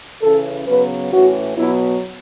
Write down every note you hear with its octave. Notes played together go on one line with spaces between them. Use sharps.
C#3 E3 C#4 A4
C#3 F#3 B3 B4
A2 E3 C#4 F#4
B2 F#3 B3 E4